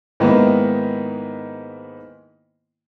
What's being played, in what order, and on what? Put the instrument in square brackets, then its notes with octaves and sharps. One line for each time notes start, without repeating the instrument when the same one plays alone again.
[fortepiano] G#2 D#3 A#3 B3 E4